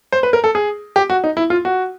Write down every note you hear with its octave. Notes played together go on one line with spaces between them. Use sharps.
C5
B4
A#4
A4
G#4
G4
F#4
D#4
E4
F4
F#4